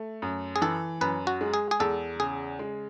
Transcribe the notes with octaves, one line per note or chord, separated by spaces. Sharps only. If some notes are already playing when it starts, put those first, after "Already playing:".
Already playing: A3
F#2
G#4
E3 A4
F#2 B4
F#4
G#3
G#4
G#4
E2 A4
C#3 G#4
G#3